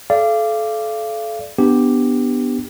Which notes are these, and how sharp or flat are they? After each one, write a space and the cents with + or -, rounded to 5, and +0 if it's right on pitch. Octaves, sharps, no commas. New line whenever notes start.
A4 -30 D5 +0 F5 -35
B3 +0 D4 +0 G4 +0